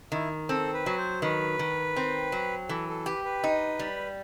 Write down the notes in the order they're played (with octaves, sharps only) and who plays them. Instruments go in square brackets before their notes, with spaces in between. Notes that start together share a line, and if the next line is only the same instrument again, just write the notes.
[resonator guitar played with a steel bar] D#3 [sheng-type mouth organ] E4
[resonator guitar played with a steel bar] C4 [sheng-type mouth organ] A4
[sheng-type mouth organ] B4
[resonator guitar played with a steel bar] F#3
[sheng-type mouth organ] C5
[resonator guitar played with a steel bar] D#3 [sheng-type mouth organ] B4
[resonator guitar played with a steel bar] D#3
C4
F#3
[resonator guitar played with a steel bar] E3 [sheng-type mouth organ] A4
[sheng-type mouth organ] A4
[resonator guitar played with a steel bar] G4 [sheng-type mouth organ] B4
[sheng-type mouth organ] B4
[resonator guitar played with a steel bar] D#4
G3